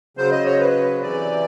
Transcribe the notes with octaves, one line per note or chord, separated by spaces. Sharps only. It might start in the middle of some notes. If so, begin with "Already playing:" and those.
C#3 F#3 C5
D#5
C#5
B4
C3 E3 D5